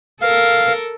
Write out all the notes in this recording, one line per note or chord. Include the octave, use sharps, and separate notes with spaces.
A4 A#4 F5